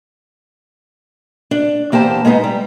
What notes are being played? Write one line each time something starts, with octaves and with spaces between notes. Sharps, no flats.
D4
E2 A#3 G4 C5 A5
G#3 A#3 B3 C#4 D#4
G3